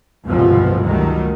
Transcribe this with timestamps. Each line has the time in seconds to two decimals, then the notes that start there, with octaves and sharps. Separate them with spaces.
0.24 G1 C2 F2 B2 E3 F3
0.83 C#2 D#3 F#3 G3 A3